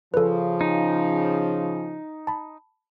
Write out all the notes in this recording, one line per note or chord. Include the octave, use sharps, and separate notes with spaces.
C#3 F3 A4 B4
D#4
A5 B5